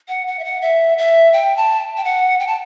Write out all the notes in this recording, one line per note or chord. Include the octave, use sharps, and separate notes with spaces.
F#5
F#5
E5
F#5
E5
E5
G5
A5
G5
F#5
G5
A5